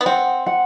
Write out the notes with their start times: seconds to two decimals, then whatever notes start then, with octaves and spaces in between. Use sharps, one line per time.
0.01 B3
0.06 C4 F#5
0.46 F#5